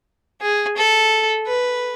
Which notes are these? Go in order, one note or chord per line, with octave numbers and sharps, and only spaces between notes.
G#4
A4
B4